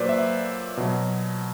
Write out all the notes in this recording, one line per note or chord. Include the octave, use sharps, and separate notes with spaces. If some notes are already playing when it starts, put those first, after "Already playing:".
Already playing: A#2 F#3 B4 C5 D5
E5
B2 F#3